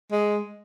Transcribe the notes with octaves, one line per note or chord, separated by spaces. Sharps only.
G#3